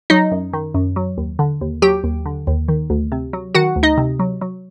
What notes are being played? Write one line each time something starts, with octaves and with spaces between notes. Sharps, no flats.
F#3 D#4 D#5
F#2
D#3
F#2
F#3
D#2
D3
D#2
F#3 G4 G5
D#2
D3
D#2
D#3
D2
C3
F#3
D#3 F#4 F#5
D2
D#4 D#5
C3
F#3
F#3